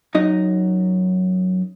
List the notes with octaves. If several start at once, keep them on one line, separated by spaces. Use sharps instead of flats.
F#2 D#4 D#5